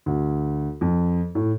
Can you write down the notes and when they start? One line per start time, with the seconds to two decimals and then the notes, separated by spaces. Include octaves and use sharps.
0.06 D2
0.81 F2
1.35 A2